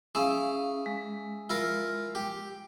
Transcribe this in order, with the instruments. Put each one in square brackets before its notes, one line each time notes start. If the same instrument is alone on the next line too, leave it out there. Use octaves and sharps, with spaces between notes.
[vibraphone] C#4 F5 [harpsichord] E4 G#4
[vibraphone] G#3
[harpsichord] E4 F4 A#4
G4